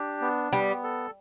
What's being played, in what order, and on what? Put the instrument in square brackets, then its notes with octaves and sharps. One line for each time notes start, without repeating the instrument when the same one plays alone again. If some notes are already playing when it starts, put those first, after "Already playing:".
Already playing: [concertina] D4 G4
B3
[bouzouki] G3 [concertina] B3
[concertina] A4